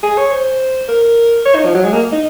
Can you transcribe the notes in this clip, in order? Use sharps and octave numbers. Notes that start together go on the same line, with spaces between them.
G#4
C#5
C5
A#4
C#5
D#4
F3
F#3
G#3
A#3
D#4